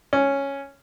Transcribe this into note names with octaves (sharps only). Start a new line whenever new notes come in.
C#4